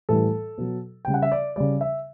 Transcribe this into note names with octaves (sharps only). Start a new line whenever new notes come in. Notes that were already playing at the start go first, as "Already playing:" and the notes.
A2 E3 G3 A4
B2 F#3
C#3 G3 G5
F#5
E5
D5
C#3 G3 D5
E5